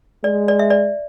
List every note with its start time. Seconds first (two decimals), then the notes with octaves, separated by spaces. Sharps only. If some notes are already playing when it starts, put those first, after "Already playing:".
0.24 G#3 D5
0.48 D5
0.59 E5
0.70 D5